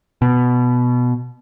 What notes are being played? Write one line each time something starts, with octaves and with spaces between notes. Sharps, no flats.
B2